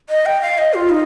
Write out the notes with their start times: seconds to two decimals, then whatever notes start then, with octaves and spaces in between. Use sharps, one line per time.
0.10 D#5
0.26 G5
0.42 F5
0.58 D#5
0.74 F4
0.90 D#4